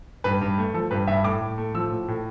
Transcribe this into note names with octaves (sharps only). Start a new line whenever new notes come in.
G2 B4
G2
A3
F3 A4
G2 B4
G2 E5
A2 D6
A2
A3
F3 E6
A2
A2